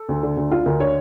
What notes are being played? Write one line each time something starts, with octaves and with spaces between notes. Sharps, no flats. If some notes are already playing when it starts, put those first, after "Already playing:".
Already playing: A4
D2
D3
D2
D3 F4
D2 A#4
D3 C#5